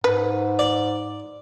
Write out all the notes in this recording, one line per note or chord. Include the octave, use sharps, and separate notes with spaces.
G#2 B4
D5